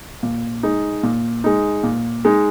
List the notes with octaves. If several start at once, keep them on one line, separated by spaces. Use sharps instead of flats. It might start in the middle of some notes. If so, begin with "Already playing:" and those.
A#2
G#3 D#4
A#2
G#3 D#4
A#2
G#3 D#4